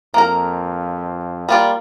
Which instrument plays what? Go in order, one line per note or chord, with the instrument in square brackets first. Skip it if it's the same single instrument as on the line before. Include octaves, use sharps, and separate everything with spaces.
[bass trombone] F2 [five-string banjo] A#3 A#4
[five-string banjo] G3 F4 D5 [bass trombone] A#3